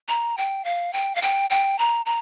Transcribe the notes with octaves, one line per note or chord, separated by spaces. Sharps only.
A#5
G5
F5
G5
F5
G5
G5
A#5
A#5